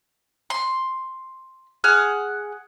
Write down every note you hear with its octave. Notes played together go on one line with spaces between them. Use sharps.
C6
G#4 F#5 F6